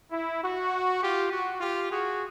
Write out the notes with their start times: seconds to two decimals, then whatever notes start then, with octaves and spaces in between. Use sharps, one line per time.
0.11 E4
0.42 F#4
1.01 F4 G4
1.31 F#4
1.61 F4 G4
1.90 F#4 G#4